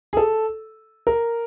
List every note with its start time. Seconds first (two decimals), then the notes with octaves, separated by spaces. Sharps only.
0.13 G#4
0.17 A4
1.07 A#4